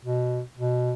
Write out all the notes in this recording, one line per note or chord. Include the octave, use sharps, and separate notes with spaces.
B2
B2